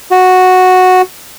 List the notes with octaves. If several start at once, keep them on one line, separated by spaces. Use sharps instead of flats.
F#4